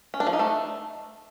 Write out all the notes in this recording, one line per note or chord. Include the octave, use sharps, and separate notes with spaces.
C#4
D4
F3
D#4
A3